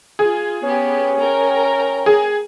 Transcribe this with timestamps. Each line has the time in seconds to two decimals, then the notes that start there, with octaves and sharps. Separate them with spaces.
0.19 F4 G#4
0.63 B3 C#4 G4
1.20 A#4 G5 A#5
2.06 G#4